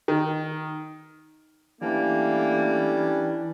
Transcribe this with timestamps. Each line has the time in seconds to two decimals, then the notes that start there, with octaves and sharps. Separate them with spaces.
0.08 D#3
1.81 E3 G3 A3 A#3 C#4 D4